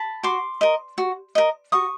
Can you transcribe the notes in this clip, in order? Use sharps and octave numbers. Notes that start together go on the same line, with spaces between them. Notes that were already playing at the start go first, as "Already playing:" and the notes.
Already playing: A5 B5
F#4 C6 D6
A#4 D#5
F#4
A#4 D#5
F#4 C#6 D#6